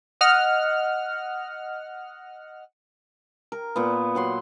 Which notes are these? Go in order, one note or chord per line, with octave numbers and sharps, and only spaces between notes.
D#5 F#5 F6
A#4
A#2 B3
F#3 F#5 C6